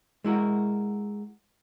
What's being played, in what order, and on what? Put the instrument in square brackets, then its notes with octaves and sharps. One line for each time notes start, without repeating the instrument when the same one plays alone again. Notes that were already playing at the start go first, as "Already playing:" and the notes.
[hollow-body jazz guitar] G#3 E4 F#4 A#4